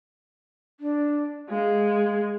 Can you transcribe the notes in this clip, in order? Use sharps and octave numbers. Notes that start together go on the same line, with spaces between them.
D4
G#3 F5